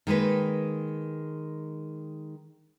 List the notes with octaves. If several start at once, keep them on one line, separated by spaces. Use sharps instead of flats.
D#3 G#3 A#3 B4